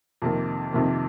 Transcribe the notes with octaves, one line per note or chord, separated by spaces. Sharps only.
F2 C3 D#3 A#3
F2 C3 D#3 A#3